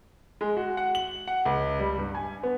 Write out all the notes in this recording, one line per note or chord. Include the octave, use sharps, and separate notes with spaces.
G#3
F#4
F#5
F#7
F#5
C#2
G3
G2
G#5
B3